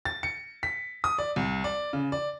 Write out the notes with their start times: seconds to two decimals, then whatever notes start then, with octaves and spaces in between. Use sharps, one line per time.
0.05 A6
0.23 C#7
0.63 B6
1.04 D#6
1.18 D5
1.36 C2
1.64 D5
1.93 C#3
2.12 D5